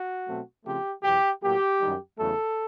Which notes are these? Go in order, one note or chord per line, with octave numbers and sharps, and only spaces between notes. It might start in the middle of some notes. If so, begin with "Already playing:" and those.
Already playing: F#4
B2 F#3 A3 C4
C#3 F3 A3 C4 G4
E2 B2 F#3 G4
A2 F#3 A#3 G4
F#2 D#3 G3
E2 C#3 F#3 A3 A4